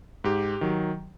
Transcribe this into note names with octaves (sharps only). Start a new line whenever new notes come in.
G#2 G4
D#3 F#3